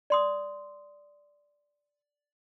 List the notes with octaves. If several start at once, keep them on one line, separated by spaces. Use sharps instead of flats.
D5 C6 D#6